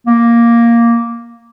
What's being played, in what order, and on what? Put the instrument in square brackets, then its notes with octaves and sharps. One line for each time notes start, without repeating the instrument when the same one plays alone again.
[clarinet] A#3